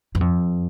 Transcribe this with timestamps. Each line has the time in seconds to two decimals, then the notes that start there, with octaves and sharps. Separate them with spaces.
0.15 F#2
0.21 F2